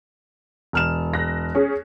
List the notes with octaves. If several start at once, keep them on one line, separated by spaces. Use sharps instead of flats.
E1 F6 E7
F#6 A#6
C#4 G#4